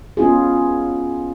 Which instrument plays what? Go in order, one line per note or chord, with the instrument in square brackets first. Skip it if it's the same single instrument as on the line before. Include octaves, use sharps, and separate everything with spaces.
[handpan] B3 C#4 F4 G#4